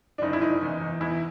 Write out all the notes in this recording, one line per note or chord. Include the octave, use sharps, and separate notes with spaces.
D4
F#1 D#4
E4
F#1 D#4
E2
E2
E2 E4